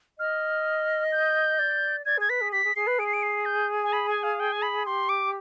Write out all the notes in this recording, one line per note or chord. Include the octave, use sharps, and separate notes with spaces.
D#5 F6
G6
D5
D5 G#6
G#4 G#6
B4 B6
G#4
G4 B6
G#4
G#4 C7
B4
G#4 D7
C7
D7
C7
G6
G#5
B5
G#5
F5
G5
G#5
B5
G4 C6
D6